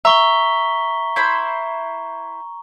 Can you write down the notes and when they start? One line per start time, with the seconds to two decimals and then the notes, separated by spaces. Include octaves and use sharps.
0.05 E5 A#5 C#6 G7
1.16 E4 C5 B5